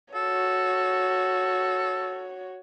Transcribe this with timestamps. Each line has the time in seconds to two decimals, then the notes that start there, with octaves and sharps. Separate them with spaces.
0.14 F#4 A4 C#5